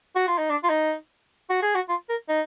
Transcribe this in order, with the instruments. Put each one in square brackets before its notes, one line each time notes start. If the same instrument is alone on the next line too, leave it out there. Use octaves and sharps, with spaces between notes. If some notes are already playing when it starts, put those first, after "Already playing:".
[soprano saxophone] F#4
F4
D#4
D4
F4
D#4
F#4
G#4
F#4
F4
A#4
D#4